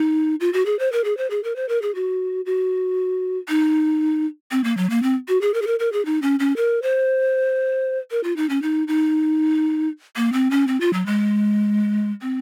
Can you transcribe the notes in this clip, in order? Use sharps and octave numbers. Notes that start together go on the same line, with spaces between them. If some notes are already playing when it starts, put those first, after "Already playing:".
Already playing: D#4
F4
F#4
G#4
C5
A#4
G#4
C5
G#4
A#4
C5
A#4
G#4
F#4
F#4
D#4
C4
A#3
F#3
A#3
C4
F#4
G#4
A#4
G#4
A#4
A#4
G#4
D#4
C#4
C#4
A#4
C5
A#4
F4
D#4
C#4
D#4
D#4
A#3
C4
C#4
C4
F4
F#3
G#3
C4